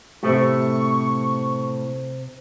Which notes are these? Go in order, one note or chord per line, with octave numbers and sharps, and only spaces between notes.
A2 C3 A3 G4 C#6